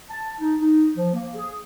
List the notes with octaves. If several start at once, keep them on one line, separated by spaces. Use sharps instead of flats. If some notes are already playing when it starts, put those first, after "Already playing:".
A5
D#4
D#4
F3
A#3
G#4